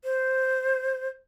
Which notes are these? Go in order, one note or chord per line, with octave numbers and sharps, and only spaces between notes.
C5